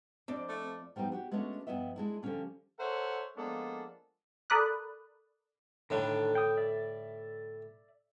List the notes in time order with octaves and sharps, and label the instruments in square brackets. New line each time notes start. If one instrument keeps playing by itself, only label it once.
[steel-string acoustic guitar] F2 [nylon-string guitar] C4 D4 [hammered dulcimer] A4 D5
[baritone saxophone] A3 [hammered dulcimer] F4
[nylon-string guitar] F3 G3 B3 D#4 G4
D4 F#4 G4
G#3 A3 B3 C#4 D4 F#4
G2 B2 F3 B3 D#5 E5
G#3 D4 E4
D3 F3 G3 C#4 D4
[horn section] A4 A#4 C5 C#5 E5 F#5
F3 G#3 A#3 B3 D4 A4
[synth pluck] A4 A#4 D5 B5 D#6 F#6
[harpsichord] A2 D3 G3 [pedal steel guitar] D#3 D4
[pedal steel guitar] G5 D#6
D5 E5